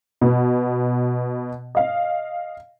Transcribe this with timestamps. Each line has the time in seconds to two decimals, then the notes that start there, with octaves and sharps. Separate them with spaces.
0.21 B2 B3
1.75 D#5 F5